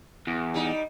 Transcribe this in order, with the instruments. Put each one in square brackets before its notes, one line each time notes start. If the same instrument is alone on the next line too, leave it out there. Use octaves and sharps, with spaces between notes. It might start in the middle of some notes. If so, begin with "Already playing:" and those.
[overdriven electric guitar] E2
[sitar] G3 D#4